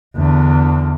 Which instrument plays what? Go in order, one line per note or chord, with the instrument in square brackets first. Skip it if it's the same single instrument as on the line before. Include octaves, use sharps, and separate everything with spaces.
[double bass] E2 D3